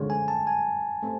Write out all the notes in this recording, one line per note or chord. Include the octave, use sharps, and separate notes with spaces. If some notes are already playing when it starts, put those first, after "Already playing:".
Already playing: D3 F3 G#3 C#4
G#5
A5
G#5
A3 C4